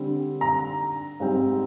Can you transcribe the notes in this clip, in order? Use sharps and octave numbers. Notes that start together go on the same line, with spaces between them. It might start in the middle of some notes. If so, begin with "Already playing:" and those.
Already playing: D3 G3 C4
A#5
G#2 G3 C4